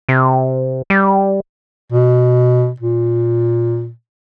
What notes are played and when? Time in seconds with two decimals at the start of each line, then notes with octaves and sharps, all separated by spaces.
0.09 C3
0.90 G3
1.93 B2
2.80 A#2